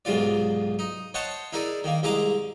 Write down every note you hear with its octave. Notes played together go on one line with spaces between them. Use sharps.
B1 G#2 C3 F4 D5
D#4
C5 C#5 D#5 F#5 A5
D#4 E4 G#4 A#4 D5
D#3 A#3
C2 G#3 E4 D#5 A#5 D6